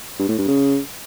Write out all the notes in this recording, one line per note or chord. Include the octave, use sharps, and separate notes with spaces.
G2
A2
G2
C#3